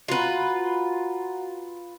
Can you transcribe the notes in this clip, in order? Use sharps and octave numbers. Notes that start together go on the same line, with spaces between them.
F4 F#4 B4 F#5 A#5